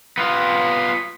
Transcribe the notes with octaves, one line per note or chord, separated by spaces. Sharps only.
B3 F4